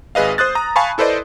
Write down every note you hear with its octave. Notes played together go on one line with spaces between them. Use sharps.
G#1 G#4 B4 D#5 F5
C5 D#6 F#6 A6
A#5 D#6
F5 G#5 A5 B5 C#6
E4 A4 B4 C5 D5 D#5